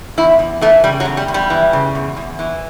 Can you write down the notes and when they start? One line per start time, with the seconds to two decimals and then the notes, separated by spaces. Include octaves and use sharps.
0.17 E2 E4
0.39 E2
0.61 E3 A3
0.84 C#3 G3
1.00 F#3
1.05 E2
1.17 G3
1.28 E2
1.34 G3
1.50 E3
1.73 C#3
1.95 E2
2.17 E2
2.39 E3